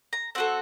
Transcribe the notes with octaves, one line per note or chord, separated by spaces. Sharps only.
A#5
C4 F#4 A4 F#5